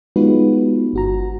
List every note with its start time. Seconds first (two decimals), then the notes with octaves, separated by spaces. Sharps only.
0.16 G#3 B3 D#4 F4 F#4 B4
0.93 G1 F#4 A#5